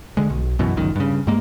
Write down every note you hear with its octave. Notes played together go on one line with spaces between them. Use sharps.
D3 G#3
B1
F#2 B2 E3
G1 C#2 F#2 D#3
G2 C#3
G2 G#3 A#3